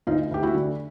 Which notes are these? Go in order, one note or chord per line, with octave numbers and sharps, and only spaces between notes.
D2 D#4 F4
D2 G4
E4 F#4
D3